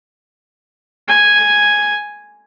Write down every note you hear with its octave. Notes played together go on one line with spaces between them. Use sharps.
G#5